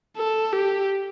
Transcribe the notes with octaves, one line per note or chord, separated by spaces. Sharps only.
A4
G4